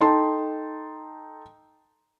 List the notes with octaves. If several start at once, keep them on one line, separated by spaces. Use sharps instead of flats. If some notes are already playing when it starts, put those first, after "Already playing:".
D#4 A4 G5 A5 C6